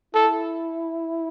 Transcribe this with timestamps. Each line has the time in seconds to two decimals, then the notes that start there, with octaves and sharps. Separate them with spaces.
0.15 E4 A4